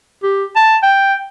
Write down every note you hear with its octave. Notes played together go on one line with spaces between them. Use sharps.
G4
A5
G5